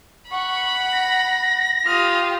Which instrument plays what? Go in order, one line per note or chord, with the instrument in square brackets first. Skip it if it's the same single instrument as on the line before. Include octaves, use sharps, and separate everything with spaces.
[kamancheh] F#5 [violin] B5 [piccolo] C#6
[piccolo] A#6
[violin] F4 G4 [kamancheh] D#6 F6